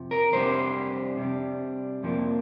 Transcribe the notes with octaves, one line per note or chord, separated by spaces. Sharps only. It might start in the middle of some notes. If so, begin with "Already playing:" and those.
Already playing: F2 C3 F3
A#4
F2 C3 G3 D4 C5
C3 G3 D4
F2 C3 F3 A#3 D4